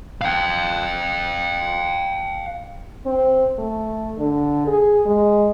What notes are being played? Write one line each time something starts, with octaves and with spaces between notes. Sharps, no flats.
F5 G5
C4
A3
D3
G#4
G#3